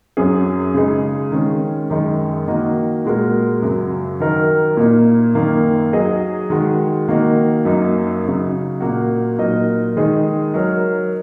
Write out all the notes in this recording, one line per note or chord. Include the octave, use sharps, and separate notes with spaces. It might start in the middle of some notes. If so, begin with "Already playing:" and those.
F#2 F#3 C#4 G#4
C#3 G#3 D#4 G#4
D#3 G#3 C#4
F#2 D#3 G#3 D#4
D#3 A#3 F#4 D#5
A#2 G#3 F#4 A#4
F#2 C#3 F#3
D#3 F#3 D#4 A#4
A#2 A#3 D#4
F#2 D#3 A#3
F#3 D#4 G#4 D#5
D#3 G#3 F#4
D#3 A#3 F#4 D#5
F#2 F#3 A#3 D#4
C#3 F#3 D#4
A#2 A#3 F#4
A#2 F#3 D#4 A#4 D#5
D#3 G#3 D#4 G#4 D#5
F#3 D#4 A#4 C#5